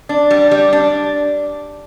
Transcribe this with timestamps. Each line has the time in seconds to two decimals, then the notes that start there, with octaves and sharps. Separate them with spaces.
0.09 D4
0.30 G3
0.51 G3
0.73 D4